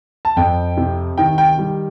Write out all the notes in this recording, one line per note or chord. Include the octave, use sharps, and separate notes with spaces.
A5
F2 G5
C3
D#3 G5
G5
G3